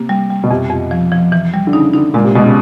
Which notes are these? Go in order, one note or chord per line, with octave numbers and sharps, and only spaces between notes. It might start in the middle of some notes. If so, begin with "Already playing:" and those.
Already playing: C3 A#3
G3
G3
B2
F2 C3
F2
F3
F3
E3
G3
D3
C#3 D#4
D3 D#4
A#2 G#3
C3
B2 G#3
C#3